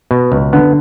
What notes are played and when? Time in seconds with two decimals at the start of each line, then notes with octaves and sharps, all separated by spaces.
0.11 B2
0.32 C#2
0.53 D3 B3